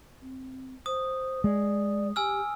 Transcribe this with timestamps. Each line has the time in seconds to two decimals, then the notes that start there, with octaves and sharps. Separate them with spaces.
0.21 C4
0.86 C5 D#6
1.44 G#3 D5
2.16 G4 G#5 E6 F6